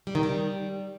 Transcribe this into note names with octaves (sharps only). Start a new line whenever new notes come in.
G3
D#3
G3